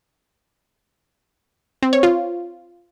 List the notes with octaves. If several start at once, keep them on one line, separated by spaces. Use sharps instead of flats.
C4
C#5
F4